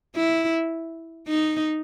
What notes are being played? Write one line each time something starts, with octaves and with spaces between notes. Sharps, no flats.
E4
D#4